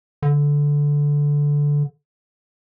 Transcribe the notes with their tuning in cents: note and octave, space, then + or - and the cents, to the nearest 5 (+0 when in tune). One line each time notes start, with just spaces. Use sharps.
D3 -10